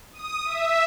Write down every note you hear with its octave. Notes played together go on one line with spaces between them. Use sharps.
D#6
E5